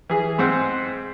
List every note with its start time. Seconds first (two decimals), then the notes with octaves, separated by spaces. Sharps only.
0.09 E3 G#4
0.39 G#2 C4 F#5